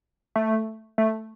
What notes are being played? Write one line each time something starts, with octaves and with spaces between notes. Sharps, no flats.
A3
A3